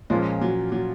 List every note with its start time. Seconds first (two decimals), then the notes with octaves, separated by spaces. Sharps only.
0.10 A#2 F3 G#3 A#3 C#4 F4
0.41 F#3
0.72 F#3